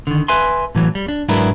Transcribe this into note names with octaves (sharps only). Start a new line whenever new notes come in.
D3 D#3
B4 E5 G#5 C6
A2 E3 F#3
G3
D4
G#2 F#3 D4 E4 A#4 B4